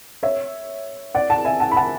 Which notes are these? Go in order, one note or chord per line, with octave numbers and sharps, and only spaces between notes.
C#5 E5
D5 F#5
F#5 A5
E5 G#5
F#5 A5
B5
F#5 A5